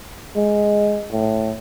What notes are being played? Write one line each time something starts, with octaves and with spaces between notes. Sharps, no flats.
G#3
A2